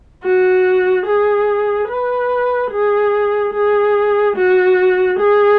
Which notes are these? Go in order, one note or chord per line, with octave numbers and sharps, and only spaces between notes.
F#4
G#4
B4
G#4
G#4
F#4
G#4